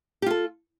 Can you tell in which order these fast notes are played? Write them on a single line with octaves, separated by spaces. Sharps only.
G4 F4 A4